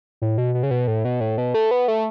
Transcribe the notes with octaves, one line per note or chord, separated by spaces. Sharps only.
A2
B2
B2
C#3
B2
A2
B2
A2
B2
A3
B3
A3